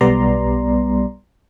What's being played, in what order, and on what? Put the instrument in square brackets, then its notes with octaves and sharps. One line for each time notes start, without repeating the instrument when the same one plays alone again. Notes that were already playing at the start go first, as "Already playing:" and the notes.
[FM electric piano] B1 G3 B3 D5 A#5 C6